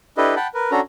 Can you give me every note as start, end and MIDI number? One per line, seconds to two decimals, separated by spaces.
0.17 0.35 62
0.17 0.35 64
0.17 0.35 67
0.17 0.35 69
0.17 0.35 71
0.17 0.35 75
0.36 0.47 78
0.36 0.47 79
0.36 0.47 81
0.36 0.47 83
0.54 0.71 70
0.54 0.71 71
0.71 0.80 61
0.71 0.80 62
0.71 0.80 66
0.71 0.80 69
0.71 0.80 82